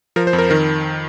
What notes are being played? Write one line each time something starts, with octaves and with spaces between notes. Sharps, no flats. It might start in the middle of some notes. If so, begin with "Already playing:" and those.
F3 A#4
C5
F2
A#4
D#3 A#4